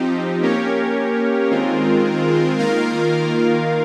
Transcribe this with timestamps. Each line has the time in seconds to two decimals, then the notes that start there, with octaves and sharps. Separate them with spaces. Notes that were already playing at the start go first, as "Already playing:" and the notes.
Already playing: F3 C4 D#4 G4
0.41 A#3 C#4 G4 A#4 C#5
1.50 D#3 G#3 C4 F4 A#4
2.59 D#3 A#3 F4 A#4 F5